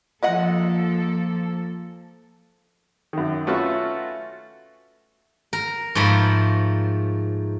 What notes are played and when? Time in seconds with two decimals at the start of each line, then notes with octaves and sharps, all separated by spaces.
0.23 F3 G#3 A#3 A4 D#5 F#5
3.13 F#2 D#3
3.47 A3 C#4 F4 F#4 B4
5.53 A#4
5.95 G#2 F3 A3 A#4 B5